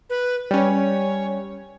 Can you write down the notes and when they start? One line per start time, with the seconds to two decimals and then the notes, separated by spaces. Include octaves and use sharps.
0.10 B4
0.51 G3 C#4 C#5